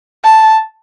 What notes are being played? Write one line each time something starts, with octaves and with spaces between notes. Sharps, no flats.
A5